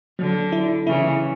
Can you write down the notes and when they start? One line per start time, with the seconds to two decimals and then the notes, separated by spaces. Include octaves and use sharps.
0.19 D3 F#3
0.52 E4
0.87 C#3 E3 E4